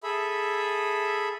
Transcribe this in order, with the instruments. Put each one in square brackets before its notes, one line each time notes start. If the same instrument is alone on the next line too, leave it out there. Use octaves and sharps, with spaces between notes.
[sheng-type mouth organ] G#4 A4 E5 B5